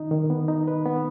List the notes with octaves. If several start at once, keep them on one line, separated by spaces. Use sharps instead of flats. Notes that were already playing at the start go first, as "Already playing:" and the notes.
Already playing: D#3 D#4
D#3
B3
D#4
B4
B3